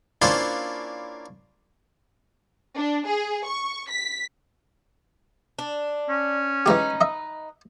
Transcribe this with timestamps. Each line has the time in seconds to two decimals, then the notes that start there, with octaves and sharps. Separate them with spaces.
0.22 A#3 C#4 D4 E4 F4 C5
2.77 D4
3.07 G#4
3.47 C#6
3.91 B6
5.59 D4
6.09 C#4
6.66 E3 G#3 D#4 G4 B4
7.01 D#5 E5